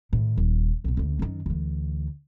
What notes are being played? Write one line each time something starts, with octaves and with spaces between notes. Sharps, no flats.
A2 D#3
D#1
B1 B2
D2 C#3
F#2 D#3
D2 E3